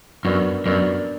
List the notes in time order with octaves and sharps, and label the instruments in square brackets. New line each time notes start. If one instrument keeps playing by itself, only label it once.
[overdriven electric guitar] F#2 [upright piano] B3 D4 F#4 A#4 D5
[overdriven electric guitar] F#2 [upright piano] B3 D4 F#4 A#4 D5